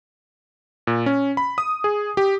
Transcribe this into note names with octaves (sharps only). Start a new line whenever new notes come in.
A#2
C#4
B5
D#6
G#4
G4